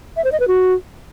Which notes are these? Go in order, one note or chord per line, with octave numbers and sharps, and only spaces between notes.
E5
C5
D#5
B4
F#4